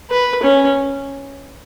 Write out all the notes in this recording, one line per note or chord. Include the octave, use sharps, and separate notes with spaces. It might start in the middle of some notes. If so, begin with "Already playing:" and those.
B4
C#4